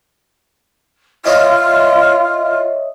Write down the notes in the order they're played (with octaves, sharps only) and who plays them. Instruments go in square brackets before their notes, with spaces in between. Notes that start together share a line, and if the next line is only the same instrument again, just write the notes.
[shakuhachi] F4 [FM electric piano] C#5 D#5 E5